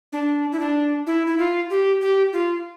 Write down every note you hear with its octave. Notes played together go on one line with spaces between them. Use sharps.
D4
E4
D4
E4
E4
F4
G4
G4
F4